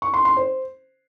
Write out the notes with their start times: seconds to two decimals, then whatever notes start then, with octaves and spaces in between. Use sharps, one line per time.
0.02 C#6
0.14 C6
0.25 C6
0.37 C5